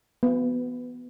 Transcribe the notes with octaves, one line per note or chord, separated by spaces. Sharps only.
B3